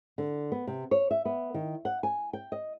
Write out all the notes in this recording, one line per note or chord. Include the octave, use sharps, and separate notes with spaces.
D3
B3
C3
C#5
E5
B3
D#3
F#5
G#5
G5
D#5